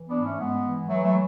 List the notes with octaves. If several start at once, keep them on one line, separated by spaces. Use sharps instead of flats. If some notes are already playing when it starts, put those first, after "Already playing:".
Already playing: E3
B3 D4
G#2
A3 C#4
G#2 G#3 B3
E3
E3 F#3 A3
F#3 A3